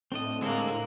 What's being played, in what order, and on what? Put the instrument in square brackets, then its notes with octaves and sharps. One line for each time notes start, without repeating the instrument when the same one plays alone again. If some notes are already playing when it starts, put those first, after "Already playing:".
[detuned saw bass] A2 [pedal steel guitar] C4 D4 D#5
[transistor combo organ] D3 G#3 E6 [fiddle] A#3 F#6